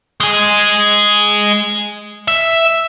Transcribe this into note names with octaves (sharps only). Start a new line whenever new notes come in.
G#3 G#4
E5